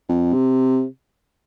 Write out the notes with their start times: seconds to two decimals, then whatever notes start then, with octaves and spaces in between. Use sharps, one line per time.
0.09 F2
0.34 C3